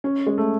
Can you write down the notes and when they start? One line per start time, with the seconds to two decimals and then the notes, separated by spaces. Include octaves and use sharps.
0.04 C#4
0.27 G#3
0.38 A3